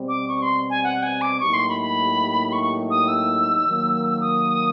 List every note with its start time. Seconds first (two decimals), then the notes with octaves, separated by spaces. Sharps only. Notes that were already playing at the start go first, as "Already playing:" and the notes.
Already playing: B2 G3 C4
0.09 D6
0.28 C#6
0.42 C6
0.70 G#5
0.84 F#5
1.03 G#5
1.21 D6
1.40 A2 F#3 A#3 D#4 G4 C#6
1.54 C6
1.69 B5
1.82 B5
2.53 C#6
2.90 D#6
3.08 E6
3.64 D#3 F#3 A#3
4.21 D#6